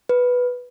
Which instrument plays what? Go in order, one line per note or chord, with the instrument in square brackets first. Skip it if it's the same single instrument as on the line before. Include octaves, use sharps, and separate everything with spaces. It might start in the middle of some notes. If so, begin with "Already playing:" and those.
[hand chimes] B4